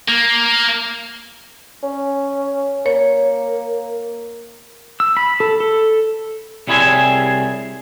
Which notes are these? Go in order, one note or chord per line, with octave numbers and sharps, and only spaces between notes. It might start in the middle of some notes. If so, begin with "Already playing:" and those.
A#3
C#4
A#3 C#5
E6
B5
A4
A4
C2 G3 E4 G#4 C#5 E5